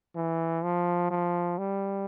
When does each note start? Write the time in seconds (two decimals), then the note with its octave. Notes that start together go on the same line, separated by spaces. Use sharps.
0.16 E3
0.64 F3
1.10 F3
1.58 G3